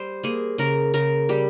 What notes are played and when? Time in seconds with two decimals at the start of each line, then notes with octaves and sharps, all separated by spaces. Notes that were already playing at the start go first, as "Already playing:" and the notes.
Already playing: G3 C5
0.23 A#3 G#4
0.58 C#3 A#4
0.94 C#3 A#4
1.29 G3 G4